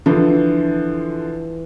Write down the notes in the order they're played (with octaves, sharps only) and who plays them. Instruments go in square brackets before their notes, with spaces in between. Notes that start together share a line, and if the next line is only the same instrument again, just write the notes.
[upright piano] D3 F3 [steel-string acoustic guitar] E3